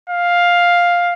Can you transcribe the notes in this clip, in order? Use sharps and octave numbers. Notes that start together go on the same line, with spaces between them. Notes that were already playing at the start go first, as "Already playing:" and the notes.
F5